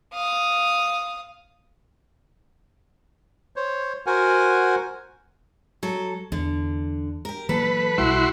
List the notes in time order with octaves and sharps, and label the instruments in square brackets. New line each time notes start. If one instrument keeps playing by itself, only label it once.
[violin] F5 D#6
[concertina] C5 C#5
F#4 A#4 C5 F#5 G#5
[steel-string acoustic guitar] F#3 A4
[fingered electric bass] E2 [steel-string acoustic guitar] D3
[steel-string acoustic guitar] G4 A#4
[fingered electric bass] E3 F#3 A#3 [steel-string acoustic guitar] A4 [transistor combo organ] B4
[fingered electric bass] B1 G3 [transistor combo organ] E4 F#4 C6